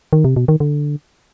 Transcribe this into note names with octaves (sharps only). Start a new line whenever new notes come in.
D#3
C3
B2
D#3
D3